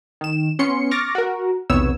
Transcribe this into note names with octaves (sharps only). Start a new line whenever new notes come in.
D#3 E7
B3 C#4 C6 C#7
C#6 D6 F6 A6 A#6
F#4 A#4
B1 E2 C3 B3 C#5 E6